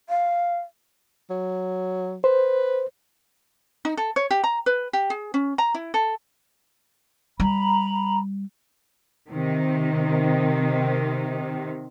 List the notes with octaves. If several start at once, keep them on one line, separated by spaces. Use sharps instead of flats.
F5
F#3
B4 C5
D#4
A4
C#5
G4
A#5
B4
G4
G#4
C#4
A#5
E4
A4
G3 A#5 B5
C3 D#3